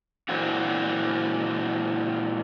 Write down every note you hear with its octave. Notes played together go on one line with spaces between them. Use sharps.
A#2 E3 F#3 C4 F4 F#4